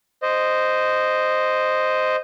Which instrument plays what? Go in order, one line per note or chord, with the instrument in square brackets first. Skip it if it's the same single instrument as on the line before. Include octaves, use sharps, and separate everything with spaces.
[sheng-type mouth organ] C5 D#5